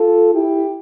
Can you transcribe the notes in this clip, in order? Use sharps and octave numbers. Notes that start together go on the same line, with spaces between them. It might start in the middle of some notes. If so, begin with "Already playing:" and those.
Already playing: F4 A4
E4 G4